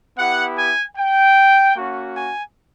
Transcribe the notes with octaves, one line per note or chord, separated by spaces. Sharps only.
B3 E4 G4 F#5
G#5
G5
A#3 C#4 F#4
G#5